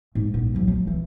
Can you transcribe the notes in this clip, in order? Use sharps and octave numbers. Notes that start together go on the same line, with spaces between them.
G#2 A#3
A#1 B3
E3 F#3
F3
E3